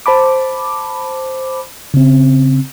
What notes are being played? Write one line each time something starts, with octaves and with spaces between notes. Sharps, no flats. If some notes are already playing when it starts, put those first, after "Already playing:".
C5 A5 B5 D6
C#3 C4